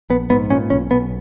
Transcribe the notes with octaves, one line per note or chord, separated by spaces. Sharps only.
A#1 B3
G#2 B3
A#2 C#4
B1 C#4
B1 B3